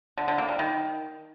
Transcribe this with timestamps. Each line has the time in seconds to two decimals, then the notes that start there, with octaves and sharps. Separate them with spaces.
0.17 D3
0.28 D3
0.38 A#3
0.49 G3
0.59 D#3